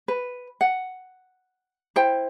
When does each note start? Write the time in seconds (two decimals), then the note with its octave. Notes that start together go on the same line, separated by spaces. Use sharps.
0.08 B4
0.61 F#5
1.96 E4 C5 G5